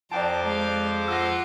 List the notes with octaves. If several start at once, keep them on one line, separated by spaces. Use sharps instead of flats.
F2 C5 D5 G5 A5 A#5 D6
G#3 F5
F4 F#5 E6 A#6